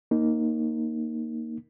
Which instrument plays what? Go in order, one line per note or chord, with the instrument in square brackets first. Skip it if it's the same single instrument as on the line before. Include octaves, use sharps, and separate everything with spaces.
[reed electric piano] A#3 D#4